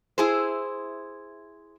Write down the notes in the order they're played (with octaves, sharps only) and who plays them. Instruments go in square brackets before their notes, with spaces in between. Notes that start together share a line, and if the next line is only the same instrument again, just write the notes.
[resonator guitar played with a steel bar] E4 G#4 C5